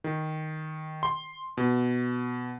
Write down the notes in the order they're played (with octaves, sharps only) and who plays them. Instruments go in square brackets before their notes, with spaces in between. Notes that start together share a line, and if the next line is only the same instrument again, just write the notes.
[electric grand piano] D#3
C6
B2